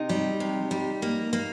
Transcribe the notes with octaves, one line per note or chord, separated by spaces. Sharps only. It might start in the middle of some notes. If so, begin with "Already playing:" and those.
Already playing: C3 D#4
G3
C3
G3
A#3
A#3